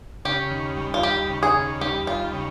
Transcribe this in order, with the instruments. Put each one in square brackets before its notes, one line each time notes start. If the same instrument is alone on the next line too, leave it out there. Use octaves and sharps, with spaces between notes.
[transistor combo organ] C#3 [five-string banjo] G4
[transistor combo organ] D#2
G3
[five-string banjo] F4
[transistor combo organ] D#2 [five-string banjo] G4
[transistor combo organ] C#3
[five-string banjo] G#4
[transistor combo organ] D#2
[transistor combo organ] G3 [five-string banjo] G4
[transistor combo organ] D#2 [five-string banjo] F4
[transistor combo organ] C#3